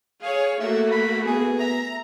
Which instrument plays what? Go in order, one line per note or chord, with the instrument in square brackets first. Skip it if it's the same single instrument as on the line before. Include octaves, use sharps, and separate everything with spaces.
[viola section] G#4 C#5 [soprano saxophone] F5
[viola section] A3 A#3 F#4 [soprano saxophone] E5
[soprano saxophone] B5
[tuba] B3 [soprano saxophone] G#4
[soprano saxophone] E5 [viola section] A#5